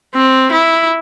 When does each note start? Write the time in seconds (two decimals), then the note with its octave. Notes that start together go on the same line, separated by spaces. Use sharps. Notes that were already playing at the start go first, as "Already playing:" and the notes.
0.15 C4
0.52 E4